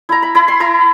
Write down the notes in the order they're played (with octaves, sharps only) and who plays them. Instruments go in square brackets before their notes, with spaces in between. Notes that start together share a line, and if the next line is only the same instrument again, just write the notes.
[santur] E4 A#5
B5
E4 B5
C6
E4 A#5